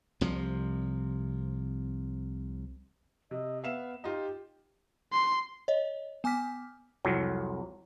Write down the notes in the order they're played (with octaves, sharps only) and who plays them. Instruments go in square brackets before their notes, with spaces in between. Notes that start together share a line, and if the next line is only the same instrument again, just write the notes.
[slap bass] C2 C3 F3
[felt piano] C3 [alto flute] D#5
[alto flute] B3 [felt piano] E5 F5 E7
[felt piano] D#4 F4 [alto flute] G4
[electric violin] C6
[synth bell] C#5 D#5
B3 G#5 D6 F6 B6
[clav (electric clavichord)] C2 F2 F#3